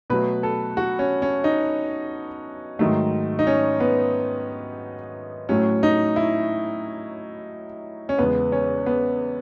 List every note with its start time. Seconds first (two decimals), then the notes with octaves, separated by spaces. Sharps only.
0.10 B2 F#3 A3 B4
0.43 A4
0.77 F#4
0.99 C#4
1.22 C#4
1.44 D#4
2.79 G#2 D#3 F#3 A3
3.39 D#4
3.47 C#4
3.80 B3
5.49 A2 F#3 A3 C#4
5.83 D#4
6.16 E4
8.09 C#4
8.18 E2 C#3 G#3 B3
8.52 C#4
8.86 B3